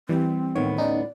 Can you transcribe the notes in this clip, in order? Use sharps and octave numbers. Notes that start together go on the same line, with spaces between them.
E3 G3 C4
D2 A2 D#3 B3 C#5
C#4 D#4 D5